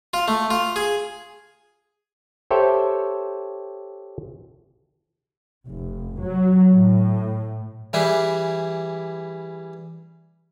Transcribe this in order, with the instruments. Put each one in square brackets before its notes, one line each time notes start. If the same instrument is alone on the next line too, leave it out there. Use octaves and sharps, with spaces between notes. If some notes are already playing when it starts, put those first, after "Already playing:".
[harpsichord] F4
A3
F4
G#4
[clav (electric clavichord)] G4 A4 C5 C#5 E5 G5
[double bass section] F1
F#3
A2
[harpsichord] E3 G3 E4 G4 G#4 B4